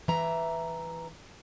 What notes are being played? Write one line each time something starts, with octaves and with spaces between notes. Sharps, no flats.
E3 E5 A#5